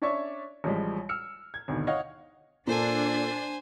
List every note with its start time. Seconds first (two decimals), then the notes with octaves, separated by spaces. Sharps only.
0.02 C#4 D4 C#5 D5 E5 C#6
0.64 A1 F3 G3 G#3
1.09 E6 F6 C#7
1.54 G#6
1.68 G#1 D2 B2
1.87 C#5 D#5 F5 F#5
2.67 A#2 D4 A4 C5 G#5